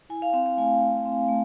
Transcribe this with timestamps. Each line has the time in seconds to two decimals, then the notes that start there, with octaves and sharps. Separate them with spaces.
0.09 E4 G#5
0.22 F5
0.33 C4 F5
0.46 F5
0.58 A3 G#5
0.81 A3
1.05 C4
1.29 A3